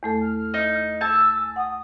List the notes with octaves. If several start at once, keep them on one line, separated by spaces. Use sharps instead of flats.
E2 A3 A4
F6
D#4
G#5 A5 E6 G6
F#5 D#6